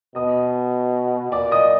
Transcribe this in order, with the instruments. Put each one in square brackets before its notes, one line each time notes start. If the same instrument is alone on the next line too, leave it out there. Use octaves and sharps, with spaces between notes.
[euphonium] B2 [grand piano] D#5 D#6
[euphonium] A#2 [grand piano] D5 D6
[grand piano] D#5 D#6